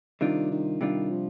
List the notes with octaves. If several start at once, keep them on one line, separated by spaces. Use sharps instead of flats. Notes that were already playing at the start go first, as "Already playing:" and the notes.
C3 D#3 G3 D4 F4
D#3
C3 D#3 G3 D4 F4
F3